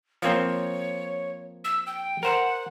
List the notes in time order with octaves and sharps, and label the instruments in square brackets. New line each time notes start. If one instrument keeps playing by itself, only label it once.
[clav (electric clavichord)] F3 A#3 C4 [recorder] C#5
[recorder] E6
G5
[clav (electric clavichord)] A#4 C5 [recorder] F#5